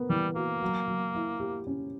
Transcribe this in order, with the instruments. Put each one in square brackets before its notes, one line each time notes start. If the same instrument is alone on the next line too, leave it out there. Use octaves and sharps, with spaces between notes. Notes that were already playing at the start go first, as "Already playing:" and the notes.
Already playing: [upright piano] B3 A#4
[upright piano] E3 [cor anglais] G3
[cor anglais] A#3 [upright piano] F#4
[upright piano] F#3
F#3
E4
G4
C#4